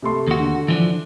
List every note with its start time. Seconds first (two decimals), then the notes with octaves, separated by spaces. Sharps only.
0.02 C3 A3 C6
0.27 D#2 F#4
0.40 D3
0.68 E3 F3 D4